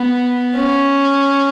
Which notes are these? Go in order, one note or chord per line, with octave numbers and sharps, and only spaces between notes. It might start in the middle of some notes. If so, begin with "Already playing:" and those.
Already playing: B3
C#4